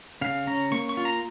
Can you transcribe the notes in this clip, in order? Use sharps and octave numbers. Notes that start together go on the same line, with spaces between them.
C#3 F5
C#4 A#5
A#3 C#6
C#6
F4
A#5